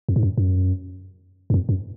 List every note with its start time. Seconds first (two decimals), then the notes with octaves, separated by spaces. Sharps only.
0.09 F2
0.16 G#2
0.23 F#2
0.38 F#2
1.50 F#2
1.54 F2
1.69 F#2